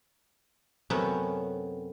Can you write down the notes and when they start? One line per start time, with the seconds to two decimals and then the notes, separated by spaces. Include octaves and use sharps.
0.90 F#2 C3 F#3 A3 B3 C#4